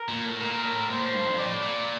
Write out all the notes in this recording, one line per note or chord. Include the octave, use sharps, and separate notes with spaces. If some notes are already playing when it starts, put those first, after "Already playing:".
Already playing: A#4
A#2
A2
A#2 A#4
A2
A#2 C5
A2
G2
F2
A2 D5
A#2